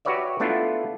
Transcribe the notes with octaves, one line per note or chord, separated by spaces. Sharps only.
F#4 G4 B4 C#5 D5 E5
A3 B3 D4 E4 F4 A4